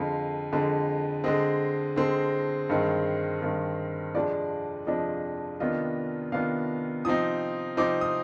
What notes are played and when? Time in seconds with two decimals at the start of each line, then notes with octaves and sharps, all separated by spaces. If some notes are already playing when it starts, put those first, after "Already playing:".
Already playing: F2 D3 G#3 F5
0.52 F2 D3 G#3
1.24 D3 G#3 C4 D#5
1.96 D3 G#3 C4
2.69 G2 D#3 G#3 C4
3.42 G2 D#3 G#3 C4
4.14 F2 C3 F3 G#3 D4 D5
4.87 F2 C3 F3 G#3 D4 D#5
5.60 C3 D#3 B3 D4 F4 D#5
6.32 C3 D#3 B3 D4 F4 F5
7.05 C3 F3 C4 D#4 D#6
7.77 C3 F3 C4 D#4 D6
8.01 D#6